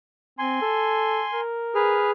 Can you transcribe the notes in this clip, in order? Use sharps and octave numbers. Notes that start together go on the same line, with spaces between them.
C4 G#5 C6
A4
A#4
G#4 B4 F6